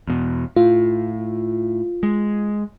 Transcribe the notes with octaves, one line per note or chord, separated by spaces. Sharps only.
E2 B2
A2 F4
G#3